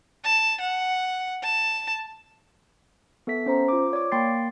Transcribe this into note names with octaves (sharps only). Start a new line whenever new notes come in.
A5
F#5
A5
B3 A4 E5 B6
C#4 C5 A#5
F4 D6
C#5 D5 D6
A#3 G5 C6 A6 C7